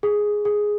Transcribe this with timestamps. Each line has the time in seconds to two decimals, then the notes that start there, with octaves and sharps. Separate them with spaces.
0.03 G#4
0.45 G#4